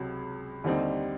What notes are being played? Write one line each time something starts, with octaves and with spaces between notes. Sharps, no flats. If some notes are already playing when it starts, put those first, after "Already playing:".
Already playing: C#2 C3 F#3
D#2 D3 G3 C4 D#4